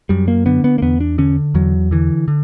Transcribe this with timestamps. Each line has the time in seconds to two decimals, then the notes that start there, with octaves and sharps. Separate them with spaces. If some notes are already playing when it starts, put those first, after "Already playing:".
0.09 F#2 G3
0.28 A#3
0.46 D3 B3
0.64 B3
0.78 A#3
0.82 E2 B3
1.00 D4
1.18 D3 C#4
1.55 E2 F#3
1.91 D3 E3
2.28 D3